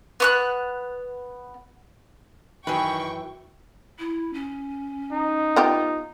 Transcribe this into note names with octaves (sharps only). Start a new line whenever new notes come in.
B3 C#6 F#6
F#2 D#3 E3 G#4 B4 G5 C#6
E4
C#4
D#4
B3 F4 G4